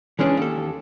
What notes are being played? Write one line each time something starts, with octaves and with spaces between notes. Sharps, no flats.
E3 G#3 C#4 D4
D#2 A4